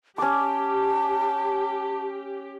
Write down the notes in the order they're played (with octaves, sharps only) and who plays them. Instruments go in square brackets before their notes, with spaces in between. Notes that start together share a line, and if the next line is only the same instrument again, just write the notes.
[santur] C#4 D6 [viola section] G4 [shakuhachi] A5